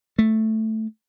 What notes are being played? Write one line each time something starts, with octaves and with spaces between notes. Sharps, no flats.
A3